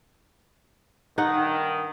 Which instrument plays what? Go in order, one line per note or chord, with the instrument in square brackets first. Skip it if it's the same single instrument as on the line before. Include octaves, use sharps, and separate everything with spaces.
[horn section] G2 D#3 [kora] D#4 F#5